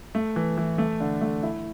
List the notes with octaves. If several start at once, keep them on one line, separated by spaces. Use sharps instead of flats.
A3
E3
E3
A3
D3
A3
E4